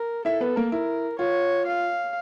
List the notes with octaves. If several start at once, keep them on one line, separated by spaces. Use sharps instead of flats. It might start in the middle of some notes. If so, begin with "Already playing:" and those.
Already playing: A#4
E4 A4 E5
B3 B4
A#3 A#4
E4 A#4
F4 C#5
F5